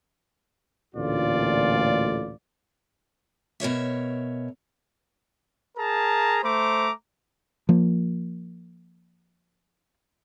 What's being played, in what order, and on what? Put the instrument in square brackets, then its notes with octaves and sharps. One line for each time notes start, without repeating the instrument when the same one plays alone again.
[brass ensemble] A1 D2 A#2 D3 F4 D5
[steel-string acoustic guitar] B2 A#4 C#5 E5
[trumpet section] G#4 A#4 A5 A#5
A3 C5 A#5 D6
[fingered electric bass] F3 A#3